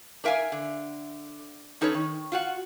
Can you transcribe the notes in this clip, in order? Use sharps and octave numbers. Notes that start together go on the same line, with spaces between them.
D4 A#4 E5 F5 G#5
D3
C#4 D#4 A4 B4 C#5
D#3
F4 F#4 F#5